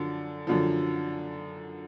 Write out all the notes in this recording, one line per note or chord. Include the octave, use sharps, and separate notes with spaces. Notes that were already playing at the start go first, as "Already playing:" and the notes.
Already playing: F#2 D3 F3
F#2 D3 F3